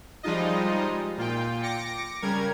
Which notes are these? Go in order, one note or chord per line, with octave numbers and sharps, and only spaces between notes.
F3 G3 G#3 D#4 F4 D#5
A#2 F4 G5
D6 A#6 C#7
C#3 G3 A#4 G#6